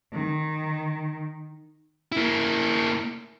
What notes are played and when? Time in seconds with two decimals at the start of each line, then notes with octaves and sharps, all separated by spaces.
0.13 D#3
2.12 A#3 E4